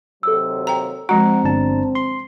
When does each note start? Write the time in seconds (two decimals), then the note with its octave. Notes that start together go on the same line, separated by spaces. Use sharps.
0.23 D#2 C3 F#3 A4 E6
0.67 G5 A#5
1.09 F3 G#3 C4 F#4 F#5 A#5
1.44 G1 D4 A5
1.95 C6